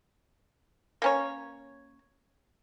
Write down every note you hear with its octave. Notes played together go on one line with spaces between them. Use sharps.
A#3 C#4 C#5